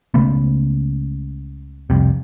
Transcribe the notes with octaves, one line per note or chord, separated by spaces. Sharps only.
C#2 C#3 A3 B3
C2 F2 C3